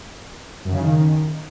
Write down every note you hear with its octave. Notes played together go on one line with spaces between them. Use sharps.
F#2
C#3
D#3